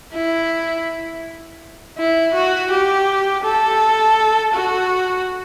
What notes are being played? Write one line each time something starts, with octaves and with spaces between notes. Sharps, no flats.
E4
E4
F#4
G4
A4
F#4